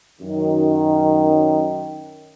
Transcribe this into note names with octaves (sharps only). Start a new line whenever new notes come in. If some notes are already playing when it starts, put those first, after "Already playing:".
F#2 D#3